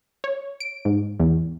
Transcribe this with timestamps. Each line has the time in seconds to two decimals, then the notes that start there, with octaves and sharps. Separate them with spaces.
0.24 C#5
0.60 D7
0.85 G#2
1.20 E2